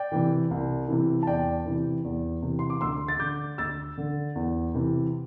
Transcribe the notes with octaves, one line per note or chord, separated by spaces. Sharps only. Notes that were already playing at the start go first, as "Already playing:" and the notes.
Already playing: D5 G5
C3 E3
C2
C3 E3
A5
E2 D5 G5
C3 E3
E2
C3 E3
C6
D6
D2 C6 E6
A6
D3 D6 G6
D2 E6 A6
D3
E2
C3 E3